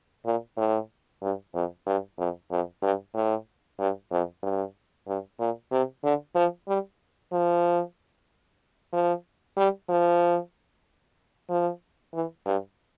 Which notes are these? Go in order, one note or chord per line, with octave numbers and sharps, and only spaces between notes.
A#2
A2
G2
F2
G2
F2
F2
G2
A2
G2
F2
G2
G2
A#2
C3
D3
F3
G3
F3
F3
G3
F3
F3
E3
G2